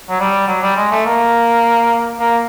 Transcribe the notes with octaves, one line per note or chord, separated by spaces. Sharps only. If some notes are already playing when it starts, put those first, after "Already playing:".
F#3
G3
F#3
G3
G#3
A3
A#3
A#3